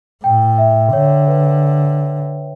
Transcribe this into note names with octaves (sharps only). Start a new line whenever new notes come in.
A2 G5
E5
D3 C#5
B4